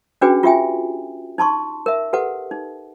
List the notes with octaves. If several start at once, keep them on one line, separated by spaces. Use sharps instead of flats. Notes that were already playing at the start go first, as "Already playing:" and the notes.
C#4 D4 F#4 G#4 B4 G5
F4 G4 E5 G5 G#5
D#4 A5 C6 C#6
A#4 E5
G4 A4 B4 F#5
D#4